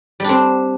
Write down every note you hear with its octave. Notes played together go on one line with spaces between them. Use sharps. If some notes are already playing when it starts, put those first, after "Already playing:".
G3 C4 D4